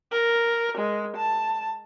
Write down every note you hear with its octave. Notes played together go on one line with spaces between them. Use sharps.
A#4
G#3
A5